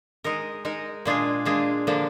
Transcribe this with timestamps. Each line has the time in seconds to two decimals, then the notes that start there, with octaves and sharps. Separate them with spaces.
0.24 G#3 D#4 A#4
0.65 G#3 D#4 A#4
1.05 A#2 G#3 D4 F4 G#4
1.45 A#2 G#3 D4 F4 G#4
1.87 D3 F3 A#3 D4